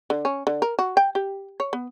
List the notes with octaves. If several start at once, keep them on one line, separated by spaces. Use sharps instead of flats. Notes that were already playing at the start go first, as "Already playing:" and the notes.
D3
C#4
D3
A#4
F#4
G5
G4
C#5
B3